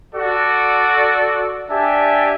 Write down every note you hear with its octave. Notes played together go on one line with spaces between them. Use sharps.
F#4 A4 D5
D4 G4 D5 E5 G#5 A5